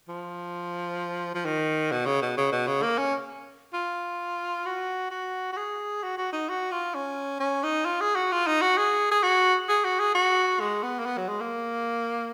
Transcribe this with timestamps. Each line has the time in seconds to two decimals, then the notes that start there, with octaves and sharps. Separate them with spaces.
0.08 F3
1.34 F3
1.45 D#3
1.92 B2
2.06 C#3
2.22 B2
2.37 C#3
2.52 B2
2.67 C#3
2.82 A#3
2.98 C#4
3.74 F4
4.66 F#4
5.11 F#4
5.53 F#4
5.57 G#4
6.03 F#4
6.18 F#4
6.33 D#4
6.49 F#4
6.71 F4
6.95 C#4
7.40 C#4
7.63 D#4
7.85 F4
8.01 G#4
8.16 F#4
8.32 F4
8.47 D#4
8.61 F#4
8.77 G#4
9.11 G#4
9.23 F#4
9.69 G#4
9.84 F#4
9.99 G#4
10.15 F#4
10.60 G#3
10.83 B3
10.99 A#3
11.06 B3
11.17 F#3
11.28 G#3
11.40 A#3